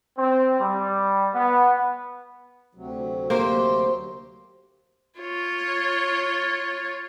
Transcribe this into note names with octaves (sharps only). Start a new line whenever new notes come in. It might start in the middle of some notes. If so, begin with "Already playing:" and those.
C4
G3
B3
D2 C3 F#3
A#3 G4 C5
F4 C#5